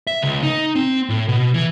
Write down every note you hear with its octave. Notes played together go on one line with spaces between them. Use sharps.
E5
C#2
D#4
C4
A2
B2
E3